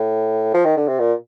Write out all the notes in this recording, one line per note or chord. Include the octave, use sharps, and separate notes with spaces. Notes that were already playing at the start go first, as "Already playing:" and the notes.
Already playing: A2
F3
D#3
D3
C3
A#2